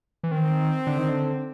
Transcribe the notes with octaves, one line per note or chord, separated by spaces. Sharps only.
E3
D#3 C4
D3
D#3
D3